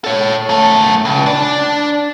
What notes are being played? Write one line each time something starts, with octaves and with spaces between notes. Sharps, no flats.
A4 C#5
F#2 A3
C#2
D4 D5